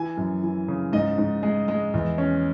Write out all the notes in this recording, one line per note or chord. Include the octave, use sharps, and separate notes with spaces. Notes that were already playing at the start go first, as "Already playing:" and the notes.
Already playing: E3 G#5
F#2
E3
C#3
G#2 D#5
G#2
G#3
G#3
E2
C#4